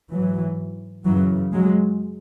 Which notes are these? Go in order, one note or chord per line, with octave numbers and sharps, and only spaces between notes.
G#2 E3 F#3
F#2 C#3 E3 F#3
F#3 G#3